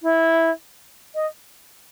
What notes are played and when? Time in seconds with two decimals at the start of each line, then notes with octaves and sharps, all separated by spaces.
0.02 E4
1.14 D#5